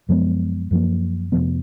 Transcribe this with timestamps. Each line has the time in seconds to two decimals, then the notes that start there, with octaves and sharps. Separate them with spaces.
0.09 F#2 F3 G#3 B3
0.71 F#2 F3 A#3
1.32 F1 F2 F3 B3